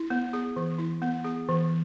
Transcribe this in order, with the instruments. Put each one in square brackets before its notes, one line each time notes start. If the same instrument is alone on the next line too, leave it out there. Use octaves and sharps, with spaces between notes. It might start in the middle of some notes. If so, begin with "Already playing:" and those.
Already playing: [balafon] E4
B3
G#4
E3
E4
B3
G#4
E3